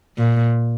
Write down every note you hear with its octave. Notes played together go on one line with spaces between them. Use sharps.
A#2